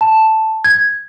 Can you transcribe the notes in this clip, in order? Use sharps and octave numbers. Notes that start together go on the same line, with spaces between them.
A5
G#6